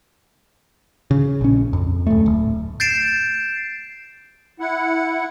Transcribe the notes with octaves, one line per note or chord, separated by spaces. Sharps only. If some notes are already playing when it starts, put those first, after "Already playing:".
C#3
A#1 C#4
F2
D1 A3
D1
G6 A6 C7 D7 E7
E4 F#5